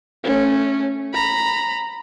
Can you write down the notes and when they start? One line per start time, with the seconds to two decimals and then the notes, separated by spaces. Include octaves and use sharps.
0.24 A3 C#4
1.13 A#5 B5